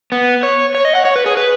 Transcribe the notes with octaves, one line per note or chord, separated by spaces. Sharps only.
B3
C#5
C#5
D#5
F#5
C#5
B4
G#4
B4